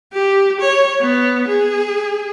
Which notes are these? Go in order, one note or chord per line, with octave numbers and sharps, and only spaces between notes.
G4
C#5
B3
G#4